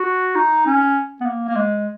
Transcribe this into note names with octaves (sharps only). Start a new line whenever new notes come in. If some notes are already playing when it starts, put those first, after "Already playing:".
Already playing: F#4
D#4
C#4
B3
A#3
A#3
G#3